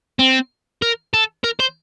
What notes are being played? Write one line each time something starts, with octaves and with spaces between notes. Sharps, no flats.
C4
A#4
A4
A#4
C5